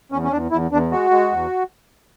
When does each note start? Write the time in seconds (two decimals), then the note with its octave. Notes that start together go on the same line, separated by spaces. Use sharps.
0.12 E2 C#4
0.24 C#4
0.32 E2 D4
0.51 E2 E4
0.71 E2 D4
0.91 G#3 F#4
1.11 G#3
1.31 E2